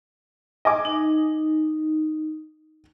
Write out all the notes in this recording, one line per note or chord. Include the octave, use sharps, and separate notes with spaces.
D#5 G#5 D6
D#4